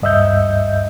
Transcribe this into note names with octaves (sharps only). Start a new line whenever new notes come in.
D2 G2 D#5 E5 E6 G6